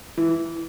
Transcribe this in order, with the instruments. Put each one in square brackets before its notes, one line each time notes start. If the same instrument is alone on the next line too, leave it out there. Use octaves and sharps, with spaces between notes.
[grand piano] E3